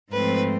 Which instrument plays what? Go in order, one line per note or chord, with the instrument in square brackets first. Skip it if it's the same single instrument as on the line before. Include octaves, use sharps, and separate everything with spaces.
[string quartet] G#2 F3 A3 C4 B4